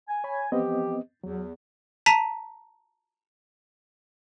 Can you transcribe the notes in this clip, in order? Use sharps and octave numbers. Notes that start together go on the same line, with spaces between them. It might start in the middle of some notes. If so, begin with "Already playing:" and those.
G#5
C#5 B5
E3 F3 B3 C4 G4 D#5
E2 F#3
A5 A#5 B6 D#7